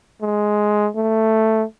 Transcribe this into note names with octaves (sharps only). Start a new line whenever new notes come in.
G#3
A3